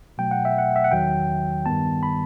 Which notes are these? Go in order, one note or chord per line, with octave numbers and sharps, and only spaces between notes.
B2 F#3 A3 G5
F#5
E5
F#5
E5
F#5
E2 D#3 F#3 G5
G2 D#3 G3 B3 A5
B5